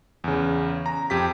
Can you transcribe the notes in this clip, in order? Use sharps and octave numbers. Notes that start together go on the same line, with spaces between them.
E2 C#3
A#5
F2 G4 B6